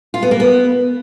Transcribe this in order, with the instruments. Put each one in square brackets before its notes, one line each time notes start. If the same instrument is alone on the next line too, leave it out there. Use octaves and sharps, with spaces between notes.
[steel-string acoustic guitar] F4
B3
A#3
B3